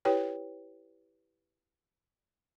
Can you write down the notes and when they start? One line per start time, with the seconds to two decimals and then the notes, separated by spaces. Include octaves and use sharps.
0.05 E4 G4 B4 C#5 G5